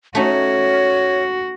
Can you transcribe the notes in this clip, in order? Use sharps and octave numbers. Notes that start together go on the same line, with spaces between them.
A3 C#4 D#4 F#4 C#5